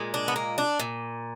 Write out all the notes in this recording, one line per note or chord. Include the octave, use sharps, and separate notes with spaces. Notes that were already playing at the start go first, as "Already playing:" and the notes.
Already playing: A#2 G#3
D4
B3
A#3
D4
A#2